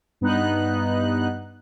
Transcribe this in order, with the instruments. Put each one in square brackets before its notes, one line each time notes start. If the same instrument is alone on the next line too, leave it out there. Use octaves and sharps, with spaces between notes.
[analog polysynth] G2 B3 D#4 F#6